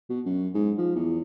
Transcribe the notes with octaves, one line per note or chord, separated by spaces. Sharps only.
B2
F#2
G#2
F3
E2